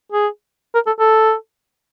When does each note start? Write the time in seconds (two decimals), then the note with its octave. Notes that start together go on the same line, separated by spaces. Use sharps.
0.12 G#4
0.74 A#4
0.87 A4
0.99 A4